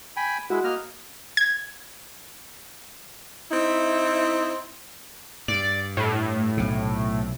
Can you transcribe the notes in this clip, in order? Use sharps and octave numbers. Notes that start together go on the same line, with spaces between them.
G5 G#5 B5
G#3 E4 F#4
A#3 D#5 F6
G#6
C4 D#4 E4
G2 D5
A2
B1 C3